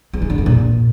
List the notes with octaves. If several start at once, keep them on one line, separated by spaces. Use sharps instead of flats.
E2
D#3
D3
E2
A#2